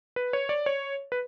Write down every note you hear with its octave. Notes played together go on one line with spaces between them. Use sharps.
B4
C#5
D5
C#5
B4